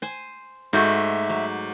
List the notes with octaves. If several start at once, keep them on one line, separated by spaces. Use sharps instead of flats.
C5 G#5
G#2 A3 F#4 E5 G6
F#3